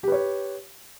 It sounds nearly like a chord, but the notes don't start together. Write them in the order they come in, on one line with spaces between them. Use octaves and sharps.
G4 B4 C#5